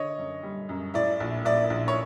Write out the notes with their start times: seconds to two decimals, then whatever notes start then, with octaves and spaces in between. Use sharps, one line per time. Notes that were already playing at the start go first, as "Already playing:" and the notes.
Already playing: D3 C#5 D#5
0.18 F#2
0.43 G3
0.69 F#2
0.94 A2 D5 E5
1.20 A#1
1.45 A#1 D5 E5
1.70 A#1
1.88 C#5